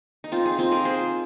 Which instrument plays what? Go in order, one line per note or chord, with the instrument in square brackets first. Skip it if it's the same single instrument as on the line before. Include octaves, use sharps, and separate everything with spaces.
[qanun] D#4
C4 F4
D#4 G#4
C4 F4
A#4 D#5
G#4 C5